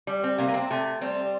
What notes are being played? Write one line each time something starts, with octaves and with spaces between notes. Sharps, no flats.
G3
C4
C3 A#3
A#3
C4
C3 A3
G3 C4